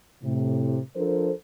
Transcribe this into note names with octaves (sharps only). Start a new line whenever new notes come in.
A2 C3
F3 D4 A4 A#4 C5